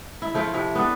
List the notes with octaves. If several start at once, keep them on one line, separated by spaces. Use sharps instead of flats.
E4
F3 A3 E4 F4
C3 F3 E4
B3 D4 A4 B4